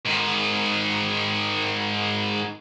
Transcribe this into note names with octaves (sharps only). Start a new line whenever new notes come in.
G#2 D#3